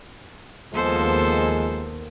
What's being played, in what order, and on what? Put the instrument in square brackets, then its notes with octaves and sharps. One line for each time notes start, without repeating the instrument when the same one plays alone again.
[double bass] D#2 [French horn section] F3 G#3 [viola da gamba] B3 A4 C5